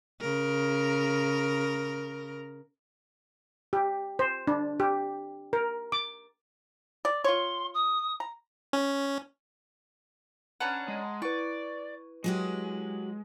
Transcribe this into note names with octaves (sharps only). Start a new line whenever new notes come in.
C#3 A#4
G4
C5
D4
G4
A#4
D6
D5
F4 C#5 C6
D#6
A#5
C#4
C#4 D4 B4 F#5 A5 A#5
G#3
E4 B4 D5 C#6
F#3 G#3 F#4 G4